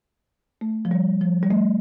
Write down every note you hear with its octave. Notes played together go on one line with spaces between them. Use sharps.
A3
F3
G3
F3
G3
A3